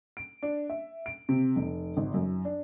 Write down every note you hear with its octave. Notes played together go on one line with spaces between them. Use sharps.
D7
D4
E5
D7
C3
F1
G#1
F#2
D4